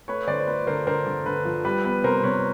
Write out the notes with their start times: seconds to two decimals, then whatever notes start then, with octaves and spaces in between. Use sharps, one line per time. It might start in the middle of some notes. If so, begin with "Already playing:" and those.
0.08 A3 B4 C#5
0.27 D3 C5 D5
0.40 C5
0.47 A3 B4
0.67 D3 A#4 C5
0.87 D3 A#4 C5
1.06 D3
1.26 D3 B4
1.45 F3
1.65 G3 B4
1.84 B3 B4
2.04 C3 A#4 C5
2.23 C3 B4 C#5